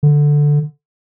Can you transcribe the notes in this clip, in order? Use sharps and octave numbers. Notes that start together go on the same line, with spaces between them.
D3